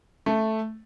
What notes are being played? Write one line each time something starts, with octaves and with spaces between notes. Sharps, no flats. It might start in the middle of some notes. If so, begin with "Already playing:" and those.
A3